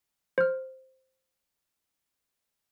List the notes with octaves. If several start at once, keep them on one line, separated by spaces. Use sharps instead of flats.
C5 F6